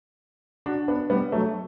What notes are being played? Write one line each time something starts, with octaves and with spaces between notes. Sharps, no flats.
D4 F#4
B3 D4
G3 B3
F#3 A3